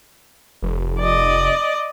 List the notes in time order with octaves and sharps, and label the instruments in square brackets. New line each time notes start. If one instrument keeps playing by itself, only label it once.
[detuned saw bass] F1
[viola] D5 D#5